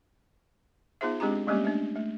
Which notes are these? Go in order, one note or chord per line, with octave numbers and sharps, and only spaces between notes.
B3 D#4 F4 G#4 C5 E5
G#3 C4 D4 G4 G#4 A#5
G3 G#3 A#3 B3 C#4 G4
A3 D4
A3